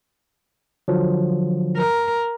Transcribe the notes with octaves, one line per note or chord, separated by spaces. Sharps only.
D3 F3 F#3
A#4